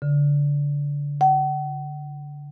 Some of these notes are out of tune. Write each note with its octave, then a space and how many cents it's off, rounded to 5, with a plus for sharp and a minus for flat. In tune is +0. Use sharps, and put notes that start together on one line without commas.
D3 -30
F#5 +40